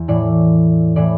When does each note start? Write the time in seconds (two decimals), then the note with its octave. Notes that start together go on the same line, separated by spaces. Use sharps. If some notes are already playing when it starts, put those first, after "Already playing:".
Already playing: E2
0.08 A2 E3 D5
0.96 A2 E3 D5